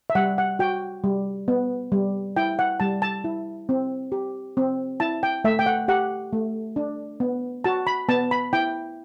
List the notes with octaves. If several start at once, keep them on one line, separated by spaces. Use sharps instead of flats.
E5
G3 F#5
F#5
F#4 G5
G3
B3
G3
E4 G5
F#5
G3 A5
A5
E4
C4
G4
C4
E4 A5
G5
A3 E5
G5
F#5
G4 F#5
A3
D4
B3
F#4 A5
B5
B3 A5
B5
E4 G5